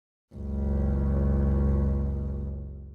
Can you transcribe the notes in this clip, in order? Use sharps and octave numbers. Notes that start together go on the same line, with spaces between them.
F#1 C#2